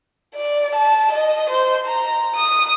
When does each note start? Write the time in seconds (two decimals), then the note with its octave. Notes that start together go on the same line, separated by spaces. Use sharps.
0.35 D5
0.75 A5
1.12 D#5
1.50 C5
1.87 A#5
2.35 D#6